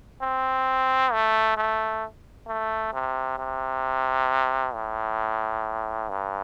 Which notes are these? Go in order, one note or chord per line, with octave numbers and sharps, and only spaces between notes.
C4
A3
A3
A3
C3
C3
A2
G2